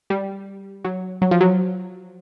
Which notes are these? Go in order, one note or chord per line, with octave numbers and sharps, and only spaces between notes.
G3
F#3
F#3
F3
F#3